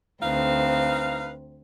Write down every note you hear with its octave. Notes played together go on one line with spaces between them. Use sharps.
D2 C4 D#4 B4 F5